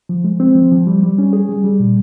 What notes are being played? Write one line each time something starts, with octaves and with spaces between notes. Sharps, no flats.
F3
G#3
C4
F3
F3
G3
G3
C#4
G#4
G3
G3
A#2